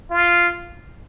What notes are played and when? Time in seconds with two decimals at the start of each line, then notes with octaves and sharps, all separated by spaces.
0.11 F4